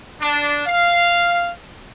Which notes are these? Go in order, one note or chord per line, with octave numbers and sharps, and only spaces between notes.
D4
F5